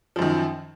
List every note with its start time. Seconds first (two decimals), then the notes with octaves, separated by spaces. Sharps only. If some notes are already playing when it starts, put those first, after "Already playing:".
0.16 F3
0.19 F#2
0.22 D#3